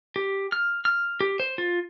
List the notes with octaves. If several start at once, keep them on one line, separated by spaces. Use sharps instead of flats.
G4
F6
F6
G4
C5
F4